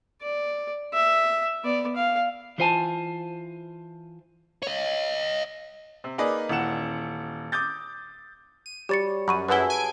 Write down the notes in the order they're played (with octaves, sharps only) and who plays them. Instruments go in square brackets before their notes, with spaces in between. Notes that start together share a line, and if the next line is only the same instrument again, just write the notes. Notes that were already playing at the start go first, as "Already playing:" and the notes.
[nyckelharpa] D5
E5
B3 D5
F5
[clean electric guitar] E3 F4 C5 D#5 G#5 A5
[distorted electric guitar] C#5 D#5
[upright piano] C3
A#3 D#4 G#4 B4 D5
D#1 E3 F#5 E7
D6 D#6 G6 A6
[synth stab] D#7
[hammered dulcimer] G3 C#5 [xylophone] G4 A6 C#7
[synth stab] F#2 [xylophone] B5 C#6 D#7
[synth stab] F#2 E4 [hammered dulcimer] G#4 A4 [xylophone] B4 F#5 G7
[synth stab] G#5 D7